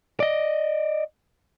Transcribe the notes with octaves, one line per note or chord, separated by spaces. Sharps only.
D5 D#5